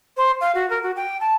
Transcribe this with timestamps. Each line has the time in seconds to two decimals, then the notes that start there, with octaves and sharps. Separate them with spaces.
0.17 C5
0.41 F5
0.54 F#4
0.70 A#4
0.83 F#4
0.96 G5
1.20 A5